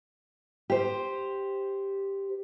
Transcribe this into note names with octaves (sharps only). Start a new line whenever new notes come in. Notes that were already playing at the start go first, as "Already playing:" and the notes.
G4 C5